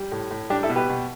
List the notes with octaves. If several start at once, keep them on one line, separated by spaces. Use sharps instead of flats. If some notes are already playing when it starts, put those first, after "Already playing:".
Already playing: G3
A2
A2
G3 D4 G4
E4 A4
B2
G4 B4
B2